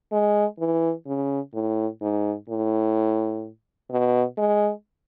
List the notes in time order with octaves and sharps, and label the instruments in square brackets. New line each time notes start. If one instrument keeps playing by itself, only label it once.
[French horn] G#3
E3
C#3
A2
G#2
A2
B2
G#3